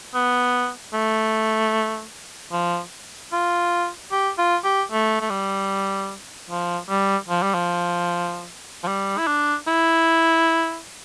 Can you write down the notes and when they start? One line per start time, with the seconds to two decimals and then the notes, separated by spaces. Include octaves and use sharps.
0.14 B3
0.93 A3
2.52 F3
3.33 F4
4.12 G4
4.38 F4
4.64 G4
4.92 A3
5.21 A3
5.30 G3
6.50 F3
6.89 G3
7.29 F3
7.42 G3
7.54 F3
8.84 F3
8.88 G3
9.18 E4
9.27 D4
9.68 E4